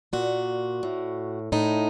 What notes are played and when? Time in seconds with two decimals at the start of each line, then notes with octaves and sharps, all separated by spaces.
0.13 A#2 F#4
0.83 A2
1.52 A2 D#4